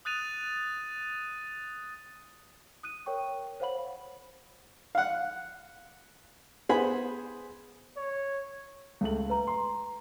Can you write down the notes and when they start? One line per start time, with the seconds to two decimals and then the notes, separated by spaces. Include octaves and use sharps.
0.05 D#6 F#6 A6 D#7 F7
2.83 D#6 F#6 D#7
3.06 A#4 C#5 G5 C#6
3.60 C5 C#5 F5 F#5 B5 F#7
4.95 F5 F#5
6.69 B3 G#4 C5 B5
7.97 C#5
9.01 C#2 A3 F#7
9.30 B4 A#5
9.47 C6